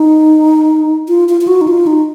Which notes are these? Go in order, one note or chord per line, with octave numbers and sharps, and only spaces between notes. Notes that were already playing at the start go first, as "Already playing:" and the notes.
Already playing: D#4
F4
F4
F4
F#4
D#4
F4
D#4